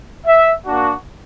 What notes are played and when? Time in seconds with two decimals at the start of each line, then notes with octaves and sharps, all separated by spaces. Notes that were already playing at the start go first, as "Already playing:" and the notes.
0.26 E5
0.65 A#3 D4 F#4